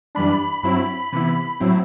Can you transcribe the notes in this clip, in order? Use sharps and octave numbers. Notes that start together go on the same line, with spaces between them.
F#2 E3 G3 D4 B5
G2 F#3 C4 E4
C3 E3 B3 E4
A2 F#3 C4 E4